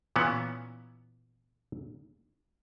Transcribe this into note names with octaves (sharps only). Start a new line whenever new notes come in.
A#2 E3 B3 C#4